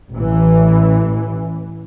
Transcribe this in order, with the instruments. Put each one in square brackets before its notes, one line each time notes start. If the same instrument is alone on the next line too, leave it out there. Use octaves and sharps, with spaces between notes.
[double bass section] A1 E3